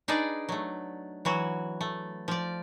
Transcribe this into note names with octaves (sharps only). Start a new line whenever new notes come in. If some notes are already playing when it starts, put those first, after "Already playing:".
D4 D#4 G#4 B4 D5 D#5
F#3 A3
E3 F#3 F#4
A3
F3 D5